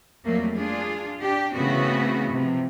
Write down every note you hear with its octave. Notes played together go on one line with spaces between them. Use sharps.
F2 F#3 G3 A3 A#3
D4 F4 G#4
D4 G4
C#3 E3 A3 B3 C4 F#4
C3 F3